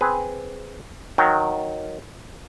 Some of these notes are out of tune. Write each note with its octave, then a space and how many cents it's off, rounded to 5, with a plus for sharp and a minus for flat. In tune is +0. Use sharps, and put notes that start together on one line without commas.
C4 +0 G#4 +0 B4 +5
D#3 +0 F#3 -10 G5 -5